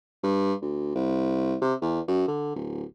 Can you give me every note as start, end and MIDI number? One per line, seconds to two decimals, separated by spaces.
0.23 0.53 43
0.62 0.94 38
0.95 1.56 36
1.61 1.74 48
1.82 2.00 40
2.08 2.26 42
2.28 2.51 50
2.55 2.84 26